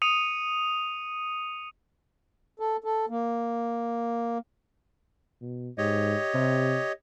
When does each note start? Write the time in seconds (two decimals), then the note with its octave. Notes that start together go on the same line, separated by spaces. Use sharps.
0.02 D#6 C#7 D#7 F7
2.60 A4
2.84 A4
3.09 A#3
5.41 B2
5.78 G#2 G4 C#5 D#5
6.34 C3